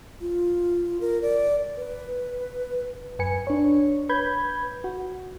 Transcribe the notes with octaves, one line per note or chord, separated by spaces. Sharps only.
F4
A#4
D5
B4
F#2 B4 G#5 C#7
D4 C#5
B4 B5 G6 G#6
F#4